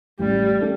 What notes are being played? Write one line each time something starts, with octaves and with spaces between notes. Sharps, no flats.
A1 G3
A3